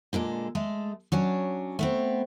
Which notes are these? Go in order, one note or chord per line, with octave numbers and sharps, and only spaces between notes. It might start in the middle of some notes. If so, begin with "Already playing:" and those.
A#2 D3 G#3 A4
G#3 A3 A4
F#3 C#4 D4
A3 B3 C4